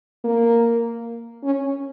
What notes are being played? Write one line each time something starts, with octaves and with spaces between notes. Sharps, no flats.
A#3
C#4